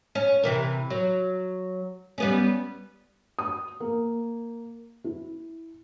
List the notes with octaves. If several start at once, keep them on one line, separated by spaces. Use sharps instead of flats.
C#4
C3 E3 A#4
F#3
G3 B3 C#4
D#6
A#3
E4